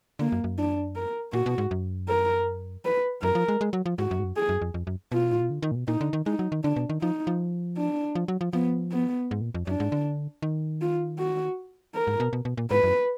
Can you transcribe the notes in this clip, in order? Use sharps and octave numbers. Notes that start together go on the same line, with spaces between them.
D3 A#3
F#2
F#2
D4
A#4
A#2 F#4
B2
G#2
F#2
A#4
B4
F#2 A#4
F3
G#3
G#3
F#3
F3
G#2 F#4
F#2
G#2
F#2
G#4
F#2
F2
F2
F#2
B2 F4
A#2
B2
D3
D#3
A#2
B2
A#2 D#4
D3
D#3
G#3 D#4
F#3
D#3
D3 D4
B2
D#3
F3 D#4
F3
D4
F3
F#3
F3
F3 B3
B3
G#2
A#2
F2
F#2 D4
G#2
D3
D#3
F4
F#4
A#4
G#2
B2
B2
B2
A#2
G#2 B4
F#2